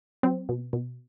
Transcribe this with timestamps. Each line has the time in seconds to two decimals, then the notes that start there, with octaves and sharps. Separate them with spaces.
0.23 F#3 C4
0.49 B2
0.73 B2